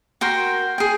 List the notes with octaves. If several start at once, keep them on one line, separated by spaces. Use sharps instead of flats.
F#4 A#4 G5 C6
G#4 G5